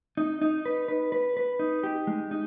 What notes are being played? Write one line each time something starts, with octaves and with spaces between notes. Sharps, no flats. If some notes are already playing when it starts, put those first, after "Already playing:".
D#4
D#4
B4
B4
B4
B4
D#4
G4
G#3
D#4